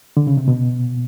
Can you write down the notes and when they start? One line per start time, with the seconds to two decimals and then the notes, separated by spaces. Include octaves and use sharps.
0.17 D3
0.27 C#3
0.37 C3
0.48 B2